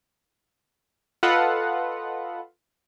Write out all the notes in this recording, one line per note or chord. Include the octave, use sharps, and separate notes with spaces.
F4 A4 B4 D#5 F#5